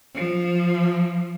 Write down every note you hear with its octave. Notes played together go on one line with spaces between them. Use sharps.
F3